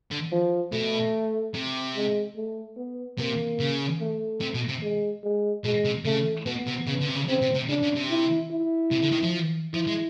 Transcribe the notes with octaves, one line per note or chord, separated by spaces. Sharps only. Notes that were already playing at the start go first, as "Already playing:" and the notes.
D3
F3
B2 A3
C3
G#3
A3
B3
C3 A#3
C#3
A3
C3
B2
C3
G#3
G#3
B2 G#3
C3
C#3 A3
B2 B3
C3
C#3
D3
C3
C#3
C#3 C4
C3
C3
C#3 D4
C#3
C3
E4
E4
C3
D3
D#3
F3
F3 E4
G#3